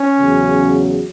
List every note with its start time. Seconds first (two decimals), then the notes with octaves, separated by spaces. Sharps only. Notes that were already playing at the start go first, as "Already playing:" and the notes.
Already playing: C#4
0.16 E2 C#3 F#3